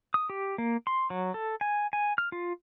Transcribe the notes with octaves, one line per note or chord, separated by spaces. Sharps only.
D#6
G4
A#3
C6
F#3
A4
G#5
G#5
F6
F4